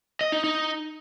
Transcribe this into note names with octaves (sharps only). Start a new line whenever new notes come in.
D#5
D#4
D#4